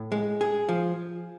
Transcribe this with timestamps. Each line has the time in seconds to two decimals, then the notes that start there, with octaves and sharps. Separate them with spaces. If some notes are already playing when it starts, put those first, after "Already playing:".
Already playing: A2
0.12 G#3
0.41 G#4
0.69 F3